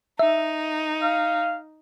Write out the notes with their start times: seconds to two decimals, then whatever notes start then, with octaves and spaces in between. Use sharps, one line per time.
0.19 D#4 E5
1.02 F5